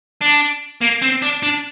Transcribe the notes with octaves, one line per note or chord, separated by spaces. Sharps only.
D4
A#3
C4
D4
D4